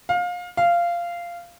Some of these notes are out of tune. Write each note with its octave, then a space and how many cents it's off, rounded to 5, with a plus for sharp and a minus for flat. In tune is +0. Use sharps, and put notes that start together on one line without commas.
F5 +25
F5 -15